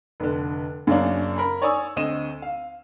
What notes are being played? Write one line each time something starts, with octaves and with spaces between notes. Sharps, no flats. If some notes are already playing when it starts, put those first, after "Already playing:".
F1 D3
F#2 C#3 A#3 C#4 D4
A#4 B5
C#5 D5 G#5 C#6 D#6 E6
D2 C4 D#5 D#7 E7
F5